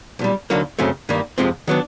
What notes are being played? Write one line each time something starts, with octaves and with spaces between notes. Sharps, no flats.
B1 A#2 G3
D2 D3 F#3 A#3 D#4
F#2 C#3 F#3 A3 C4
G2 D#3 G3 A#3
F2 C3 F3 G#3 C4
D#3 F#3 B3 D4